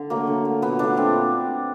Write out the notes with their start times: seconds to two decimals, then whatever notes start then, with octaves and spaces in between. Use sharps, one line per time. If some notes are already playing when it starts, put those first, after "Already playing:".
Already playing: D3
0.10 F#3 A3 A#3
0.27 D3
0.45 F#3 A3
0.62 A#2 B3
0.79 F#3 A3 D4
0.97 A#2 C4